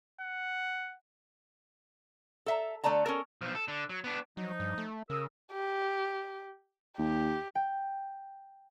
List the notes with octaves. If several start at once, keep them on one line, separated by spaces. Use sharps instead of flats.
F#5
A4 E5 A#5
D3 A3 D5 A5 A#5
C#4 A4 A#4
B1 F3
A4
D3 D4
F#3
B3 D4
F3 F#3 D#4
G2
A3
C#3 A#4 D#6 E6
G4
D#2 G4
G5